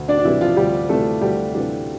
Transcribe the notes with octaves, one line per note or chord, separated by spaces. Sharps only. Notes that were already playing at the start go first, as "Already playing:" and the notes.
Already playing: D2
D4 D5
D4
C3 E3 G3 E4
F3 F4
D2 G3 G4
C3 E3 G3 A3 A4
D2 G3 G4
C3 E3 G3 D4